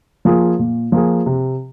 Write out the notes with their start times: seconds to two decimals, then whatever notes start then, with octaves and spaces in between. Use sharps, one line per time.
0.25 F3 A#3 F4 G#4
0.59 A#2
0.92 F3 A#3 F4 G#4
1.26 C3